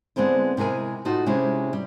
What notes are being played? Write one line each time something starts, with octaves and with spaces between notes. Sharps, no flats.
D3 G#3 B3 C4 E4
C3 G#3 E4 A#4 G#5
A2 A3 D#4 F4 F#4
C3 G#3 C#4 E4 G4
G3